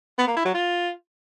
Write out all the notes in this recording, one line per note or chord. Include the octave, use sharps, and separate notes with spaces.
B3
A#3
E4
F#3
F4